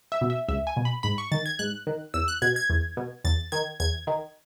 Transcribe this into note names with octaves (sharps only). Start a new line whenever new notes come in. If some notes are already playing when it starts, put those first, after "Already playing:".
E5
B2
E5
C#2 E5
G#5
B2
B5
G#2 B5
C#6
D#3 A6
G#6
G#2 F#6
D#3
E2 E6
F#6
B2 G#6
G#6
E2
B2
E2 A6
D#3 G#6
E2 G#6
D#3